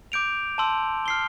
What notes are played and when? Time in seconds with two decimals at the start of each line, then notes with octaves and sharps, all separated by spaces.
0.12 D6 G6 D7 F7
0.58 A5 C6 E6
1.06 F6 C7 G7